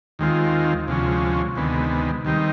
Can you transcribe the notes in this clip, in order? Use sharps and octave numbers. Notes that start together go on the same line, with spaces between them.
D#2 D#3 G#3 C4 F4
D2 C3 F3 G#3 C#4
D2 C3 D#3 G#3 B3
D#2 D#3 G3 C4 D#4